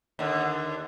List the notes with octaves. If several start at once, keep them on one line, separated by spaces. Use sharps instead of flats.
D#2 D3